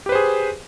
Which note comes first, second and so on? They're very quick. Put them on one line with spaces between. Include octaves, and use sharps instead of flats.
G4 B4 C5 G#4